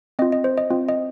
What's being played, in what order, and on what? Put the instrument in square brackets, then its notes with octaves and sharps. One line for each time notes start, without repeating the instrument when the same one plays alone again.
[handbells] C4 D#5
F4
D#5
C5
D#5
C4 F4
D#5